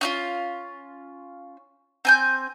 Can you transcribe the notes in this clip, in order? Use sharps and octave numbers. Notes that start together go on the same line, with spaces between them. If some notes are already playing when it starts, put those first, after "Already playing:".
C#4 D#4 F4
C4 G#5 G6